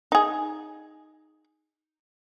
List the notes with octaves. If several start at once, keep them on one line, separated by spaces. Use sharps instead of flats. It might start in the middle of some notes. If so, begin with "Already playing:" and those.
D#4 G#4